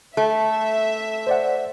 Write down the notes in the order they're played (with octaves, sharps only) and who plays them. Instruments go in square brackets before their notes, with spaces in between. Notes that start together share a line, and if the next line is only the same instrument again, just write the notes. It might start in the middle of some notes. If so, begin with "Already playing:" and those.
[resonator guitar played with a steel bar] A3 [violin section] E5
[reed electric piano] C5 D5 F#5